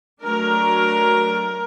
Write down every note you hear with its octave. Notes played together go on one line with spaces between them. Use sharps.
F#3 A3 D4 A#4